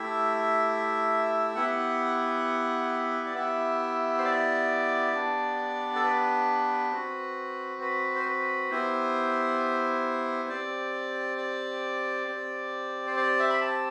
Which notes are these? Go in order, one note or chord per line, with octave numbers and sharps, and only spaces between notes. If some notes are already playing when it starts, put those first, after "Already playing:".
Already playing: A3 E4 G4 E5
B3 E4 G4 F#5
D5
B3 E4 G4 E5
C5
D5
B3 D4 G4
A4
B4
C4 F#4
B4
C5
B4
B3 E4 G4 C5
C4 G4 D5
D5
C4 G4
C5
D5
E5
B5
A5